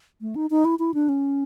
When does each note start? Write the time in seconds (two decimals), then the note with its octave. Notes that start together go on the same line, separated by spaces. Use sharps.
0.21 A3
0.36 D#4
0.50 D#4
0.65 E4
0.79 E4
0.94 D4
1.09 C#4